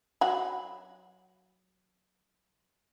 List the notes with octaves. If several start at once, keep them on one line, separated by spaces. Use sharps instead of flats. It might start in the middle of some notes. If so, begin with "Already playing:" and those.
F#3 F#5 B5